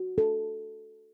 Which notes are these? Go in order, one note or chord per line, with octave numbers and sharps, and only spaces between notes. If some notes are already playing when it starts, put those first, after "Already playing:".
Already playing: F#4
A4